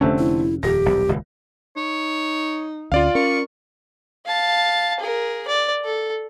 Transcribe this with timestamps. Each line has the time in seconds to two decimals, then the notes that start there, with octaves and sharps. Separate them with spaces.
0.01 F1 D3 A3 C4 C#4
0.19 E4
0.63 D#1 F2 G4 A#6
0.85 D#1 B1
1.09 D#1 C#2
1.76 D#4 C#5
2.92 D2 C#4 F4 D5 F5
3.15 C#4 A#4 C#6
4.26 F5 A5
5.00 G#4 A#4
5.48 D5
5.85 A4